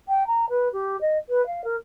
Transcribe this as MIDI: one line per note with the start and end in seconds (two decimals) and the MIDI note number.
0.08 0.26 79
0.26 0.45 82
0.49 0.68 71
0.72 0.99 67
1.00 1.17 75
1.29 1.44 71
1.46 1.63 77
1.64 1.76 70